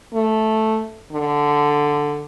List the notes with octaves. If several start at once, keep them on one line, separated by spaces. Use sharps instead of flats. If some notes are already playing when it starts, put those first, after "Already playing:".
A3
D3